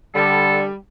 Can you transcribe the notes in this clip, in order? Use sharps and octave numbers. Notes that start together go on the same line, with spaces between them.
D3 G3 A4